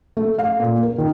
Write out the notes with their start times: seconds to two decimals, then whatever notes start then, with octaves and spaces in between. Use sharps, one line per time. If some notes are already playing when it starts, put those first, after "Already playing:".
0.17 A3
0.38 F5
0.60 A#2
0.83 A#4
0.98 D#3